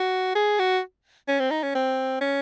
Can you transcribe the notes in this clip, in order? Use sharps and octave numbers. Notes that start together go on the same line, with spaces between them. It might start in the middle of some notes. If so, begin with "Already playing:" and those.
Already playing: F#4
G#4
F#4
C#4
C4
D#4
C#4
C4
C#4